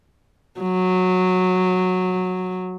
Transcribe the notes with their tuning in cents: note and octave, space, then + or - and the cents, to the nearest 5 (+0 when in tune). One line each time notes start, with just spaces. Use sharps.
F#3 -10